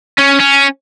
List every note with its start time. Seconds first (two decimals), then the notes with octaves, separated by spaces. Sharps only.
0.19 C#4
0.40 C#4